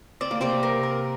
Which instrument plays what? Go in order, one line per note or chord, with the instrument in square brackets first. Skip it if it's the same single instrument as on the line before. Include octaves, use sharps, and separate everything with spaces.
[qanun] C4 [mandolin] D5
[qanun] A#3
[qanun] C3 C4 [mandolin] D5
[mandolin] A#4
A#4